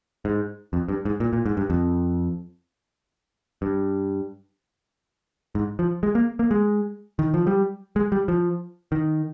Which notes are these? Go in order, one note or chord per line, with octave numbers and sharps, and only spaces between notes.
G#2
F2
G2
G#2
A#2
A#2
G#2
G2
F2
G2
G#2
F3
G#3
A#3
A#3
G#3
D#3
F3
G3
G#3
G3
F3
D#3